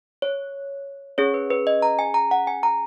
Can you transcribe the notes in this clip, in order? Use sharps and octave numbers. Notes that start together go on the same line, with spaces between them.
C#5
C#4 G#4 C#5
B4
B4
D#5
A#5
G#5
A#5
F#5
G#5
A#5